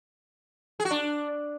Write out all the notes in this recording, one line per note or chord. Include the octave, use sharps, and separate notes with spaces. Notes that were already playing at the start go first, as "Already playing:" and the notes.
G#4
F#4
D4